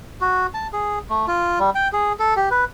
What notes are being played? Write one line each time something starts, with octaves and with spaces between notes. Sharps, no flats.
F#4
A5
G#4
A3
F4
G3
G5
G#4
A4
G4
B4